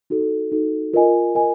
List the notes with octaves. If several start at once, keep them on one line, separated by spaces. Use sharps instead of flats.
D#4 F#4 A4
D#4 F#4 A4
F4 A#4 D#5 G#5
F4 A#4 D#5 G#5